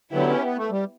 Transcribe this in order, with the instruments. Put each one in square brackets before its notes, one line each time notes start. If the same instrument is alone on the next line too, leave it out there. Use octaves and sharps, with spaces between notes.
[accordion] D3 F#3 [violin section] B3 E4 G4
[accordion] C#4
B3
A3
G3